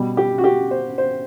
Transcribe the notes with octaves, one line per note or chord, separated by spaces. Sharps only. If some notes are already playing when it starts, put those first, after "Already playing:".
Already playing: B2 G3
G4
F#4
G4
C5
C5